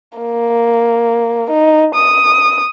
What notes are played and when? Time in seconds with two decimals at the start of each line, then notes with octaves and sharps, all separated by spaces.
0.18 A#3
1.50 D#4
1.95 D#6